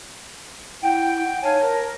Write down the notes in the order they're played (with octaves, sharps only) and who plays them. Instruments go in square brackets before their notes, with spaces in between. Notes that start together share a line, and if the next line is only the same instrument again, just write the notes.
[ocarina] E4 [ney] F#5 [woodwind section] G5
[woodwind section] D#4 F5 G#5 [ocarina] C#5 [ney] A5
[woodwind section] A#4